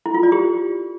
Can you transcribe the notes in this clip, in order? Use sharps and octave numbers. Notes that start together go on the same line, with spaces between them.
E4
F4
D5
G4